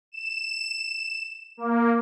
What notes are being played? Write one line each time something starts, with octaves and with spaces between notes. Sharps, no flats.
E7
A#3